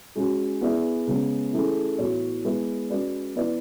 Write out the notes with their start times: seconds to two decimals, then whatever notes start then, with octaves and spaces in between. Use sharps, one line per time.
0.16 G#3 C#4 F#4
0.61 B3 E4 G#4 D5
1.07 C#3 G#3 B3
1.53 E3 A3 C#4 G#4
1.98 A2 E3 B3 F#4 C#5
2.44 G#3 B3 E4 B4
2.90 G#3 C#4 F#4 B4 D5
3.36 E3 B3 E4 B4 D5